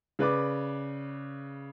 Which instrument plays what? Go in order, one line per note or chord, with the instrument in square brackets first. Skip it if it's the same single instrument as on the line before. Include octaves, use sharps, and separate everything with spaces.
[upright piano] C#3 B4 D5 D6